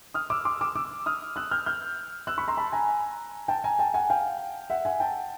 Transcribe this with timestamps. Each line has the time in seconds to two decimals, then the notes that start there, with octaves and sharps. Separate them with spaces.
0.14 D#6 F6
0.30 D6 E6
0.45 C6 D6
0.61 D6 E6
0.75 D6 E6
1.06 D#6 F6
1.36 E6 F#6
1.51 F6 G6
1.66 F6 G6
2.27 E6 F#6
2.38 B5 C#6
2.48 A#5 C6
2.57 A5 B5
2.73 G#5 A#5
3.48 G5 A5
3.64 G#5 A#5
3.79 G5 A5
3.94 F#5 G#5
4.10 F5 G5
4.70 E5 F#5
4.85 F#5 G#5
5.00 G5 A5